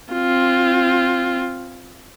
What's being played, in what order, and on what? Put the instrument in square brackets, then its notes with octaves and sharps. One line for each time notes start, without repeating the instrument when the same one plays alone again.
[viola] C4 F4